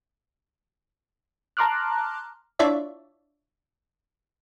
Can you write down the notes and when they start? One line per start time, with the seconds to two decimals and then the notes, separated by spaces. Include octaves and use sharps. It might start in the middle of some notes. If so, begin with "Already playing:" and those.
1.57 A5 A#5 C6 D6 F6 F#6
2.59 D4 E4 F4 C#5 D5 E5